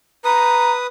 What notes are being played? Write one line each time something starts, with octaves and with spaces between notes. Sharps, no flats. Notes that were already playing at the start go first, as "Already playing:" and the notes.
B4 A#5 D#6